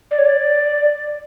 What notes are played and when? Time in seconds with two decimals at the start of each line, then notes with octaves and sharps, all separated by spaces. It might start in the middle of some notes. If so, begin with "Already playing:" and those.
0.11 D5
0.18 C#5
0.26 D5